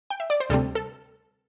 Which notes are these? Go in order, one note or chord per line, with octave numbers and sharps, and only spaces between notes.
G5
E5
D5
C5
D2 C3 G3 C4 A4
A4